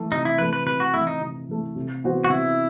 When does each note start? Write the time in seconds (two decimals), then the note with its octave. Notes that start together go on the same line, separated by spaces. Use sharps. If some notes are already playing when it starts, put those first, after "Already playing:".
Already playing: E3 A3
0.12 C3 D#4
0.25 E4
0.38 E3 A3 B4
0.53 B4
0.66 C3 B4
0.80 F#4
0.94 E3 A3 E4
1.07 D#4
1.21 C3
1.49 E3 A3
1.76 C3
2.04 E3 B3 F#4 C5
2.24 F#4
2.30 C3 E4